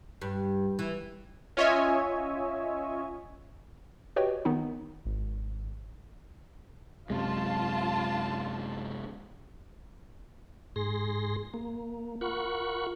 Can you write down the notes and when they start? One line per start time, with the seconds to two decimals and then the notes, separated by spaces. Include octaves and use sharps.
0.22 G2
0.79 E3
1.57 C#4 F4 C#5 D#5 E5 G#5
4.16 F#4 G4 B4 C#5 D#5 G5
4.45 D#3 B3 C4 D#4
5.05 G#1
7.10 F#2 C3 G#3 F4 A5
10.76 G#2 G#4 C6 A#6
11.54 A#3
12.21 F4 A#4 F#5 B5 C#6